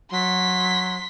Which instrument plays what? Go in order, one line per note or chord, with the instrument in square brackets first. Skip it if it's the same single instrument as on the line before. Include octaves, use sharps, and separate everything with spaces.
[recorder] F#3 [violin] C6 B6